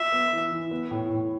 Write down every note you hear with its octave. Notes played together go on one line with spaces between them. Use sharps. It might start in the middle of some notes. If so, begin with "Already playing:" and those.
Already playing: F4 E5
B3
E3
E3
B3
A2
A2